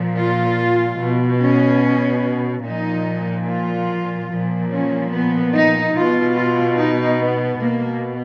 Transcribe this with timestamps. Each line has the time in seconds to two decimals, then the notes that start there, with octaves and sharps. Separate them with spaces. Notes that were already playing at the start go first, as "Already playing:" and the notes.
Already playing: A#2 F3
0.17 F4
1.00 B2
1.41 C#4
2.64 A#2 F3 D#4
3.47 F4
4.30 A#2 F3
4.72 C#4
5.13 B3
5.54 D#4
5.95 B2 F4
6.37 F4
6.78 D#4
7.19 B3
7.60 B2 A#3